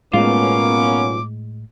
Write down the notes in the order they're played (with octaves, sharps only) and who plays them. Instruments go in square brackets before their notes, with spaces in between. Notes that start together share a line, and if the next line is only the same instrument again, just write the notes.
[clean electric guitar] B1 F4 [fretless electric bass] A2 G#3 [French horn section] A#3 B3 C#4 [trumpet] D6